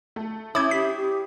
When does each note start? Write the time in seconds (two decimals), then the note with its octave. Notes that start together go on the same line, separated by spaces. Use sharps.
0.16 A3
0.55 C#4 E4 C#5 D6 D#6 G6 G#6
0.71 G4 B6
0.96 G4